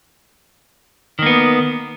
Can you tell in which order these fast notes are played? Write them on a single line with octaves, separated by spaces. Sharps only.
D#3 A#3 B3